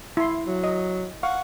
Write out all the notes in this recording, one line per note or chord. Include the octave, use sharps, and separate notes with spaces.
E4 C6
F#3
D#5
F5 F#5 C#6